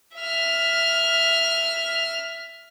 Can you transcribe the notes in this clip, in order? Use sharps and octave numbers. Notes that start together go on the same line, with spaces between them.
E5 F6